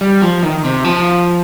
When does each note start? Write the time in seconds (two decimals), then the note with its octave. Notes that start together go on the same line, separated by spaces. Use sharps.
0.01 G3
0.22 F3
0.43 D#3
0.64 C3
0.85 F3